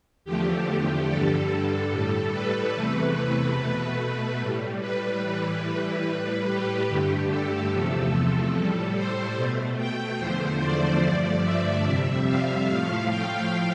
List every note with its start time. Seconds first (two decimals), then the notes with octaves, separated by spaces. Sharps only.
0.25 E2 D3 F3 A3 G4
1.08 G2 D3 G3 A4
1.91 A2 G3
2.32 B4
2.74 E2 C3 E3 A3
3.56 B2 A3
3.98 B4
4.39 A2 G3
4.80 B4
5.22 A2 E3 G3
6.05 A2 G3
6.46 G4
6.87 G2 D3 A3
7.29 A4
7.70 E2 C3 F3 A3
8.53 A2 G3
8.95 C5
9.36 B2 A3
9.77 G5
10.19 E2 D3 F3 A3 C5
10.60 D5
11.02 G2 D3 F3 A3
11.43 E5
11.84 F2 C3 G3
12.26 F5
12.67 A2 F3 A3 F5
13.09 G5